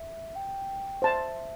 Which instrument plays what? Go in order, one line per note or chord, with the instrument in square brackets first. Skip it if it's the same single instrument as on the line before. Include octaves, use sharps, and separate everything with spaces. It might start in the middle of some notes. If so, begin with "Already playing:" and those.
Already playing: [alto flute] E5
G5
[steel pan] C5 A5 C6 [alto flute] E5